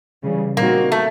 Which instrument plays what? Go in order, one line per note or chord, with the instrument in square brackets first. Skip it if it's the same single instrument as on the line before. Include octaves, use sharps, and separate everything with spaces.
[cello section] C#3 E3 G3
[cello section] A#2 G3 C4 D#4 F#4 [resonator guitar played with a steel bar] A#3
[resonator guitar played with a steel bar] A3